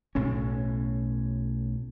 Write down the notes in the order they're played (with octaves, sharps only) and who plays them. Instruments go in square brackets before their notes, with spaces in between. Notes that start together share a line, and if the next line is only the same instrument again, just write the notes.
[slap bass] B1 A2 C#4